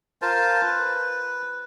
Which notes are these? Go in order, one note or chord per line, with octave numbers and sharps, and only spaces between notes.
F4 A#4 C5 A5
B4